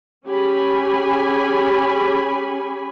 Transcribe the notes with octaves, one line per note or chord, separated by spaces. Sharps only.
C#4 G4 G#4 G#5 B5